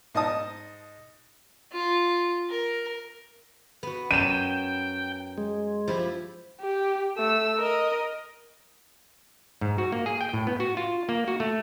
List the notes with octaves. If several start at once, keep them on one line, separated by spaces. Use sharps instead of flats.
G#2 D#5 A5 D#6
F4
A#4
B3 F#4
F#2 C#5 G5 D#7 E7
G#3
F3 E4 G4
G4
A3 E6
A#4 D#5
G#2
F#4
A#3
G#4
G5
A2
B3
F#4
F4
A#3
F#4
A3